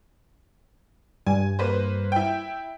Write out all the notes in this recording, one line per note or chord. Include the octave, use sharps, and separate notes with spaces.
G2 G#5
A#3 B4 C5
E4 G5